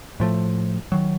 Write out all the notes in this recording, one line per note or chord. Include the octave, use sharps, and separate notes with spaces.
A2 F3 A3
D#3 F#3